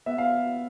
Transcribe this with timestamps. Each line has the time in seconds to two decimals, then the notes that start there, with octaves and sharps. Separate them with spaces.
0.06 B3 E5
0.18 F5